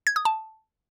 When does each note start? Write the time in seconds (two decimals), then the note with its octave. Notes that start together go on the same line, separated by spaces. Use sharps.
0.07 G#6
0.16 D#6
0.25 A5